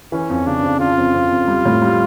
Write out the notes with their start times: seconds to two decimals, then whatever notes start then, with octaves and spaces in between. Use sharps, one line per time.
0.12 E3 C#4
0.30 F2
0.47 C#3 D4
0.63 F2
0.80 C#3 F4
0.97 F2
1.14 F2
1.31 F2
1.48 G3
1.65 A2
1.82 G3